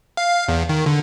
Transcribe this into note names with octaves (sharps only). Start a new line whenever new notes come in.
F5
F5
E2
D#3
D3